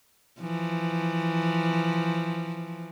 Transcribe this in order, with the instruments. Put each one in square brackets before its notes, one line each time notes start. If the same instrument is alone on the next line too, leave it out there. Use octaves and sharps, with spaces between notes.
[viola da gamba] E3 F3